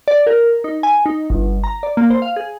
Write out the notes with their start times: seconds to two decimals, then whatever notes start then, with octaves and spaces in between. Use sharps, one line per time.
0.08 D5
0.27 A#4
0.64 D#4
0.83 G#5
1.06 D#4
1.30 G1
1.64 A#5
1.83 D5
1.97 A#3
2.10 C5
2.22 F5
2.36 G#4